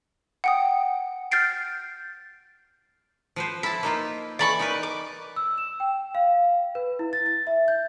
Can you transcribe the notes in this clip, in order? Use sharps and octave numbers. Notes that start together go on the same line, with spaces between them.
F#5 G5 D#6
F6 G6 A6 C7 D7
F3 B4 C5
E4 A5 B5
A#3 D#4 F4
E3 D5 B5 C#6
D#4 A#4 B4
D6
E6
E7
G5
F5
B4
E4
A6
A6
E5
G6